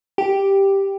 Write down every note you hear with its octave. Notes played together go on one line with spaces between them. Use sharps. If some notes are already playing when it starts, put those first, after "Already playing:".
G4